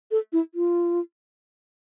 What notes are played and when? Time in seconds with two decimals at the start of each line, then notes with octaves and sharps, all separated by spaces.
0.11 A4
0.33 E4
0.55 F4